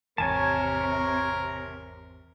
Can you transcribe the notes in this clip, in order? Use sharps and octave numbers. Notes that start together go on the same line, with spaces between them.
G#1 E2 C3 A#4 C#5 G#5 A5